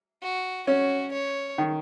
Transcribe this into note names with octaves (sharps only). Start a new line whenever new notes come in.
F#4
C#4 F#4
C#5
D#3